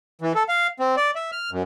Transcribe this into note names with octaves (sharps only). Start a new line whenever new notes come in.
E3
A4
F5
C4
D5
E5
F6
F#2